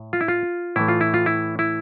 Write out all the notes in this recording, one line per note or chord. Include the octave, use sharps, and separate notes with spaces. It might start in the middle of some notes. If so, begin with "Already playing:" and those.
Already playing: A2
F4
E4
F4
A2 E3 A3 E4
F4
E4
F4
E4
E4